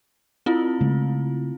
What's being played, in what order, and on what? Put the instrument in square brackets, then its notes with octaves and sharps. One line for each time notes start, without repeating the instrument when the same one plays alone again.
[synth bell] C4 E4 F4
[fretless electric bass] C#3 G#3 A3